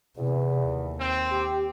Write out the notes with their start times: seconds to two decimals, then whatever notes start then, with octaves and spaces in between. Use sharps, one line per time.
0.17 E2 C3
0.67 D#2
0.99 C4
1.31 G4